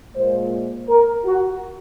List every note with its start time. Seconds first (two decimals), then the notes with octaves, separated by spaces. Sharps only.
0.15 A#2 G#3 C5
0.88 A#4
1.25 F#4